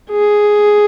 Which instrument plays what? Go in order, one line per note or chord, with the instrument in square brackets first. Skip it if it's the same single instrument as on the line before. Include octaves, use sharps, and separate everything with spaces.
[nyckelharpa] G#4